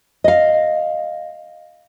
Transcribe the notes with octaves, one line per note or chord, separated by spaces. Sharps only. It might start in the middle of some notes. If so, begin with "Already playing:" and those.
D#5 F5